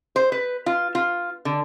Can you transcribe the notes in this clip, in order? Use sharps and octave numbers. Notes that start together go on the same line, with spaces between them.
C5
B4
F4
F4
D3